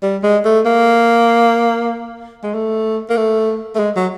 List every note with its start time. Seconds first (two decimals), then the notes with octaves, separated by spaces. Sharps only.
0.03 G3
0.23 G#3
0.45 A3
0.66 A#3
2.43 G#3
2.54 A3
3.10 A#3
3.17 A3
3.75 A3
3.79 G#3
3.96 F#3